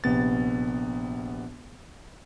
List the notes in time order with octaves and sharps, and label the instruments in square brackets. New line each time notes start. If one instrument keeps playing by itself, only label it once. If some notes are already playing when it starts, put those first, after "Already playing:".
[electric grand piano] A#1 C3 B3 A6